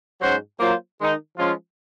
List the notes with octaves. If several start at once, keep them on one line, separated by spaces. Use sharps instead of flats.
G#2 F#3 C#4 F#4 C5
F#3 A#3 F4 C5
D#3 G#3 D#4
F3 G#3 C#4 F4